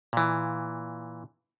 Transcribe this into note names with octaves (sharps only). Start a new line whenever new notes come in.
A#2 E3